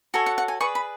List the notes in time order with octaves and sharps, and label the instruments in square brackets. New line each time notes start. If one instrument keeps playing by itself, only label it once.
[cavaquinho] F#4 A4 C#5 G#5
F#5
F#5
G#5
G#4 B4 D5 C#6
B5